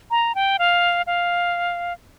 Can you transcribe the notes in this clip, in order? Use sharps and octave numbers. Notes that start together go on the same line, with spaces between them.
A#5
G5
F5
F5